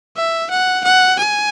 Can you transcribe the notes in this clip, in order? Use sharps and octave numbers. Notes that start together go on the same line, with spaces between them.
E5
F#5
F#5
G#5